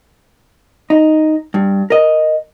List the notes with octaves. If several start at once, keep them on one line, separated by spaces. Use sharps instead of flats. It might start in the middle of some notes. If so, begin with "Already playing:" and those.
D#4
G2
A#4 D#5